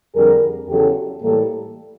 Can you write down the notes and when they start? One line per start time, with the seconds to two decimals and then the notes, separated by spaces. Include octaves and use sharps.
0.15 F2 D3 G3 G#4 A#4
0.68 E2 C#3 F#3 G4 A4
1.22 A2 E3 G3 A#3 G4 A4